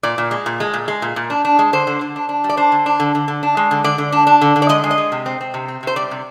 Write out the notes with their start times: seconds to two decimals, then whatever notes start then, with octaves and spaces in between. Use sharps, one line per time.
0.03 A#2 D5
0.18 A#2
0.31 G#3
0.46 A#2
0.60 G#3
0.74 A#2
0.88 G#3
1.02 A#2
1.16 A#2
1.30 D4
1.45 D4
1.59 G#3
1.73 D3 C5
1.87 D3
2.01 D3
2.16 D4
2.29 D4
2.44 G3
2.49 D5
2.57 D4 C5
2.72 D3
2.86 D4
3.00 D3
3.15 D3
3.28 D3
3.43 D4
3.57 G#3
3.71 D3
3.84 D3 D5
3.98 D3
4.12 D4
4.27 D4
4.41 D3
4.56 D3
4.62 D5
4.69 G#3 D#5
4.84 G#3
4.91 D#5
4.98 G#3
5.12 C3
5.26 C4
5.41 C4
5.54 C3
5.68 C4
5.83 C3 C5
5.96 G3 D5
6.11 C3